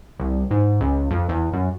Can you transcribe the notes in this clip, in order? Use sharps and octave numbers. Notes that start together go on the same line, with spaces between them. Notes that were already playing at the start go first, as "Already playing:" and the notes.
C2
G#2
C#2
F2
E2
F#2